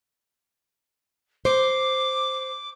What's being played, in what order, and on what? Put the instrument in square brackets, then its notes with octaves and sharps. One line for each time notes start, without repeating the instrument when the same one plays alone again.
[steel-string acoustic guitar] C5 [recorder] D6